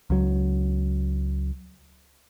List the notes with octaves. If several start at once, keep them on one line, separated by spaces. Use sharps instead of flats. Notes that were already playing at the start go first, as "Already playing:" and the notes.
C#2 F#3